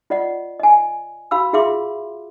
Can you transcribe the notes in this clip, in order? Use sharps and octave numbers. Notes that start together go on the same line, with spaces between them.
F4 D5 D#5 F#5
D#5 G#5
F#4 F5 B5 E6
F4 G#4 E5 F5 C6 D6